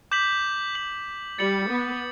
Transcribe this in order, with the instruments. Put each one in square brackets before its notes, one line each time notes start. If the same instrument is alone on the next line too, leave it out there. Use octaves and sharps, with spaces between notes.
[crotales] D6 G6 B6 F#7
D6 G6 B6 F#7
[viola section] G3 [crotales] A6 C#7 F#7
[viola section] B3